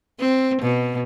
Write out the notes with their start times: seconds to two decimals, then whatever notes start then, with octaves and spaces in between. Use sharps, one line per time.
0.20 C4
0.61 B2